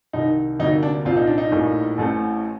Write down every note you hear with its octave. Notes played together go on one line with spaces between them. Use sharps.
C2 C3 D#3 D#4
D2 C3 G3 A#3 D#4
D4
C2 A#2 G3 C4 F4
D#4
D4
D#4
A#1 A2 G3 A#3
A1 A2 A3 C4